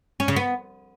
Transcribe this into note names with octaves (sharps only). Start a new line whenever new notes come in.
C#4
C#3
B3